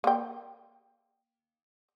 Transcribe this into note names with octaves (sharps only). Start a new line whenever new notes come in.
A#3 G5